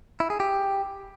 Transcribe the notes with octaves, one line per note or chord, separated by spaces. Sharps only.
E4
G#4
G4